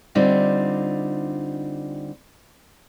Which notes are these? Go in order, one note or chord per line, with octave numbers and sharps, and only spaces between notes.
D3 G3 C4 D#4 F4